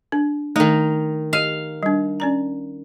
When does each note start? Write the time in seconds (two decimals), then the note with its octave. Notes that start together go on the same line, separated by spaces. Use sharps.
0.12 D4
0.56 D#3 A3 D#4
1.33 G4 D#5 F5
1.83 G3 D4
2.20 C#4 D5 A#5